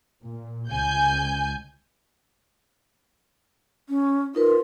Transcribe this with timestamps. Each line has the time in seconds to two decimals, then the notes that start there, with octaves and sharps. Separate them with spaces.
0.22 A#2
0.69 C#2 G#5 G6
3.89 C#4
4.35 D#4 F4 A#4 B4